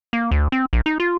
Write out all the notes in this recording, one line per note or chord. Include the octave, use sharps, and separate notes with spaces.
A#3
D2
C4
A#1
D#4
F4